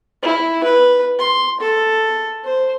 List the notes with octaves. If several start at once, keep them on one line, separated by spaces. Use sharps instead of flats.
E4
B4
C6
A4
C5